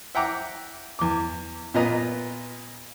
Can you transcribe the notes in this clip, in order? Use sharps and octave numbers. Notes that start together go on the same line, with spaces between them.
E5 F#5 G5 A#5 D6
E2 D6
A#2 B3 F4 D#5 A#5